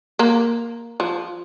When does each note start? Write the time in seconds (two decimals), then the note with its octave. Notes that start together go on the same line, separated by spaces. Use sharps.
0.19 A#3
1.00 F3